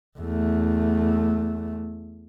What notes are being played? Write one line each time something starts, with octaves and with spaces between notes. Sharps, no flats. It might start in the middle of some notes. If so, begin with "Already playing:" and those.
E2 A3